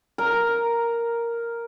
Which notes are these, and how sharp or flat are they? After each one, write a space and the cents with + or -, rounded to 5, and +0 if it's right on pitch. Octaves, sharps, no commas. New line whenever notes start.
A#4 +0 A#5 +0